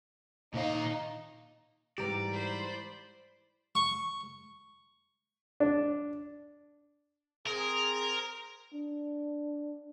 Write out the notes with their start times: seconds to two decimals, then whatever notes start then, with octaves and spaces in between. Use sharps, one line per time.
0.54 A#2 D#3 D#4 F5
1.98 G#2 E3 G3 G4 D5 A#5
2.33 C5 B5 C6
3.75 C#6
5.60 D4
7.47 C4 G#4 A#4
8.74 D4